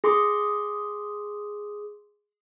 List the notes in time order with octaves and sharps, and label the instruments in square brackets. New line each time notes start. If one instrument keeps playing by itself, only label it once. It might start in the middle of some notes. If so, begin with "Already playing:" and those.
[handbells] G#4 C6 D6